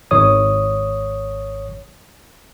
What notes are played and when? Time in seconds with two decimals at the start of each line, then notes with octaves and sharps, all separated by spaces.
0.11 G#1 C#5 D#6